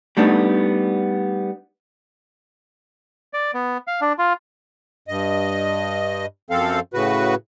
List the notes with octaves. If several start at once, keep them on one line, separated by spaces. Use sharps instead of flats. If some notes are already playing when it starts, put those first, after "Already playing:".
G3 A3 B3 D4 D#4
D5
B3
F5
D4
F4
G2 D#5
F#2 F3 C4 A4 F5
A2 C#3 F#4 B4